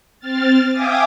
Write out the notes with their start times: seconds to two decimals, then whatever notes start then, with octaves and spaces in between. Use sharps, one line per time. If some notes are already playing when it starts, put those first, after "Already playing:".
0.20 C4 F6 A6
0.72 E5 F5 G5 G#5 D6 D#6